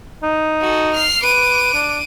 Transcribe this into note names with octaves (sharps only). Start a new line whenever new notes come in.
D#4
F#4 A4
F6 C7
B4 D6 D#7
D4